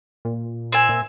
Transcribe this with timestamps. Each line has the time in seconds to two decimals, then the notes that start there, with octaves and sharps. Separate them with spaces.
0.25 A#2
0.72 C4 E5 G#5
0.89 A#2